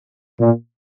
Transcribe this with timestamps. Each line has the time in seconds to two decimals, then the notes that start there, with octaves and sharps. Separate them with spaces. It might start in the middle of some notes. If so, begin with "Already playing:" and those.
0.40 A#2